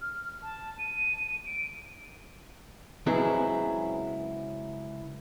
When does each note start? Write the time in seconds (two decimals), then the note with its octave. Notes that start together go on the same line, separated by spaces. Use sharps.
0.01 F6
0.43 A5
0.79 D#7
1.26 D#7
1.46 D7
3.06 C#2 F#3 B3 C4 E4 G#4